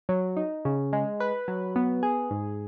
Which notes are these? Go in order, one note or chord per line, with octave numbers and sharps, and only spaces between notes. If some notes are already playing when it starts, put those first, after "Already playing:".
F#3
D#4
C#3
G#3
B4
F#3
B3
G#4
G#2